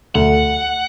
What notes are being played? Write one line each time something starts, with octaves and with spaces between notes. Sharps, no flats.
D2 F#5